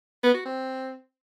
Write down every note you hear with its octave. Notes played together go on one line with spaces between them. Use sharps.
B3
F#4
C4